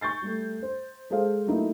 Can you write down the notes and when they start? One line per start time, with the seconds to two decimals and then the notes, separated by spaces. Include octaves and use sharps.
0.01 C#6 G6 A6 C7
0.22 G3 A3
0.62 C5
1.10 G#3 G#4 A4 C5 F5
1.46 F#3 A3 A#3 D#4 E4